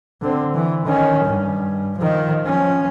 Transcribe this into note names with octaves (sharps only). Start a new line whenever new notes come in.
D3 C4
E3
D#3 C#4
G2
D#3 F3
F3 C#4